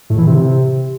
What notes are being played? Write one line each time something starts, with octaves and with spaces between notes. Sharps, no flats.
A2
E3
C3